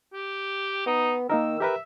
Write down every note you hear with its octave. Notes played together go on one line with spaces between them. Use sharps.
G4
B3 D#4
D#3 A#3 D#4 A#4 E6
G4 A#4 B4 E5